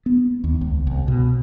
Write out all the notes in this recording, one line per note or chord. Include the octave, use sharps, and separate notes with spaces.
B3
D#2
C#2
C2
B2